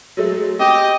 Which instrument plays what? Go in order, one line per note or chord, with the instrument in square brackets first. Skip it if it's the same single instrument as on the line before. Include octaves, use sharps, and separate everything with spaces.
[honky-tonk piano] F#3 G#3 A3
[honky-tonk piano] C4 [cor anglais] G4 [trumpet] D#5